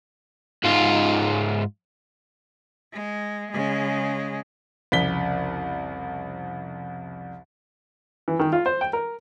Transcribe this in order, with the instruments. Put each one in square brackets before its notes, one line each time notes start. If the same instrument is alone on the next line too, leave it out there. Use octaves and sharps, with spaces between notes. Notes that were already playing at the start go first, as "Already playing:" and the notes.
[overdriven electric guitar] G#2 F4
[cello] G#3
C#3 G#3
[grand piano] C2 F2 C#3 B6 G7
[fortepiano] E3
D#3
F4
C5
G5
A#4